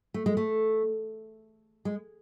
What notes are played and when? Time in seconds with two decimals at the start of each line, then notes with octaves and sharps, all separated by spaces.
0.14 A3
0.26 G#3
0.37 A3
1.85 G#3